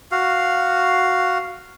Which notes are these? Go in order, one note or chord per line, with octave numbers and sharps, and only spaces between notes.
F#4 F5